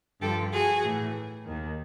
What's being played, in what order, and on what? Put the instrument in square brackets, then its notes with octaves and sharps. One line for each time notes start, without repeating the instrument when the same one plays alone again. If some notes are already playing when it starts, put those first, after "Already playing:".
[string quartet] G2 D3 F3 G4 A4
F#4 G#4
A2 E3
D#2 D#3